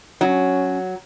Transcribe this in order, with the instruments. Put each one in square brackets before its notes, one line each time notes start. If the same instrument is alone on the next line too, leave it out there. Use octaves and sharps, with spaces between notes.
[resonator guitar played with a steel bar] F#3 [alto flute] C#4